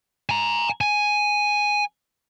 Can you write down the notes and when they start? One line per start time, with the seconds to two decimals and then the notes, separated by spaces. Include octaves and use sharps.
0.29 G#5 A#5
0.81 G#5